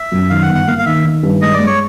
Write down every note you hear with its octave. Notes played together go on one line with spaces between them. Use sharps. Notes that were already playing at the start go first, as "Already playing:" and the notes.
Already playing: E5
F#2
D#3 F5
F#5
G1
F#5
A#3 F5
F5
D#3 E5
D#3
G2
G#3 D#5
D5
G#3
C#5